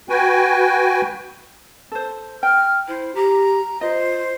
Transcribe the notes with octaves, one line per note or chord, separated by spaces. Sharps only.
F#4 B4 G5 G#5
A4 C5
G5 F6
E4 C5
G4 A#5
F4 C5 D#5